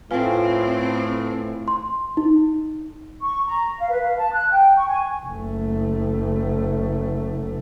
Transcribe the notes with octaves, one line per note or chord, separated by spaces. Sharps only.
A2 C4 F4 B4 F5 G5 G#5
C6
D#4
C#6
A#5
F5
B4
F5
A5
F#6
G5
C#6
G#5
F#1 A3